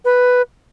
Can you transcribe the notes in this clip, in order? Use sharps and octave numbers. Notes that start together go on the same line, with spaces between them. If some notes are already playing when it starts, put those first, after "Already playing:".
B4